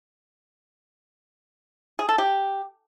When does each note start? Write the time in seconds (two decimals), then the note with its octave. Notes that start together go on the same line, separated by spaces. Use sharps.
1.99 G#4
2.09 A4
2.18 G4